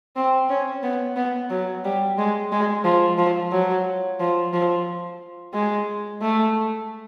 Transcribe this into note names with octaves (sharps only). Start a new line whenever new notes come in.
C4
C#4
B3
B3
F#3
G3
G#3
G#3
F3
F3
F#3
F3
F3
G#3
A3